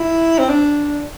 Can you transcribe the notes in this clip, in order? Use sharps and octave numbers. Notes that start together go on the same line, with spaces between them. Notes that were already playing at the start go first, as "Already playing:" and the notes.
Already playing: E4
C4
D4